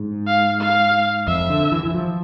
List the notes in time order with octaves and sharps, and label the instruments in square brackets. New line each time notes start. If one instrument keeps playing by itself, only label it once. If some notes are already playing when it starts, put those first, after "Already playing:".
Already playing: [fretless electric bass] G#2
[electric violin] F5
F5
[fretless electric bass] F2 [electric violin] E5
[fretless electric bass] D3
E3
E3
F3